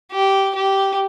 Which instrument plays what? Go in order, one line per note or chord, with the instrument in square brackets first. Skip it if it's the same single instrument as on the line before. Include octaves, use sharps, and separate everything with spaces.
[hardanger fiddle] G4
G4